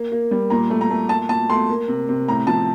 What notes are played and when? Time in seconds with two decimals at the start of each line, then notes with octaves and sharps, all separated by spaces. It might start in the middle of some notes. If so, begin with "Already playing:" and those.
Already playing: A#3
0.12 A#3
0.31 G3
0.50 A#2 A#5
0.70 A3
0.81 A#5
0.91 A3
1.09 A#2 A5
1.29 A#2 A5
1.50 A3 C6
1.69 A#3
1.88 C3
2.09 C3
2.28 A2 A#5
2.47 F3 A5